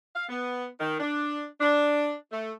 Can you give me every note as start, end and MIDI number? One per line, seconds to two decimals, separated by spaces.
0.16 0.25 77
0.29 0.66 59
0.80 0.98 51
1.00 1.45 62
1.60 2.14 62
2.32 2.51 57